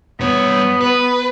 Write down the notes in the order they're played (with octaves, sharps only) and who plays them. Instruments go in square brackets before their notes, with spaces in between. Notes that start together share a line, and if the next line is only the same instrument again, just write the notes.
[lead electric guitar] G2 C#5 [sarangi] B3
[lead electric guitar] B4